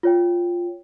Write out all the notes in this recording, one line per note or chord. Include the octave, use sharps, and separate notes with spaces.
F4 C#5 G5